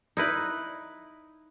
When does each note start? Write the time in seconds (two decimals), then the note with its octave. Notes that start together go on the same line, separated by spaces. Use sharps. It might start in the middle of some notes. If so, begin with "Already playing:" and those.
0.17 D#4 E4 B4